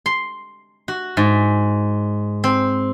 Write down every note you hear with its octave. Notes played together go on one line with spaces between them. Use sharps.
C6
F#4
G#2
C4